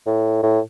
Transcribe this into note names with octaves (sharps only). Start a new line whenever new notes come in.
A2
A2